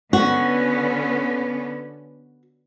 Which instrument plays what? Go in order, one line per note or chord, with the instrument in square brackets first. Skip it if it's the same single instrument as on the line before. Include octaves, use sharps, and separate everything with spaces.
[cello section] D3 B3 C#4 [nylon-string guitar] F#4